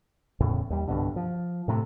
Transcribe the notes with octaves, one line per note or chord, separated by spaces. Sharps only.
E2 A2 C#3
D#2 G3
C2 G2 B2 D3
F3
A2 C3 A3